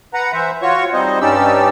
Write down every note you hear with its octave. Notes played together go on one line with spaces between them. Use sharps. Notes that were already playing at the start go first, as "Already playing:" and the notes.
B4 F#5 A#5
E3 C5 E5
F4 F#4 C#5 C#6
G3 C4 D#4 C5 D#5
G2 C#4 D#4 G4 D5 E6